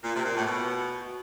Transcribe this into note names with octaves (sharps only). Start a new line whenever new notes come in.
A#2
C3
A#2
A2
B2